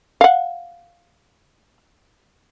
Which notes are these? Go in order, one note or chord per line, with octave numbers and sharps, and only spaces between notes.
F5 F#5